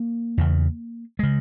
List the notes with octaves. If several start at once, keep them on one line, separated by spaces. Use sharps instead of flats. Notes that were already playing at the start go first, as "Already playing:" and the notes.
Already playing: A#3
E2 C#3
C#3 G#3